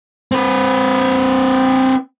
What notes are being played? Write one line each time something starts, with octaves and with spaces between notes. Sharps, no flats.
C4 B4